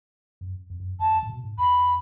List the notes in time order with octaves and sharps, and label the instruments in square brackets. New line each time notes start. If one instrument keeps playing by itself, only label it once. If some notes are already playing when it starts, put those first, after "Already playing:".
[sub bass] F#2
F2
F#2
[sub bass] F2 [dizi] A5
[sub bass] F#2
F2
A2
B2
G#2
[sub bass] F2 [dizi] B5